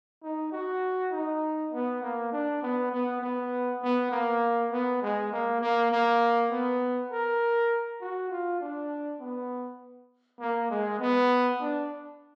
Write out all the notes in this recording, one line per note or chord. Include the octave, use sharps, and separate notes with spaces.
D#4
F#4
D#4
B3
A#3
D4
B3
B3
B3
B3
A#3
B3
G#3
A#3
A#3
A#3
B3
A#4
F#4
F4
D4
B3
A#3
G#3
B3
D4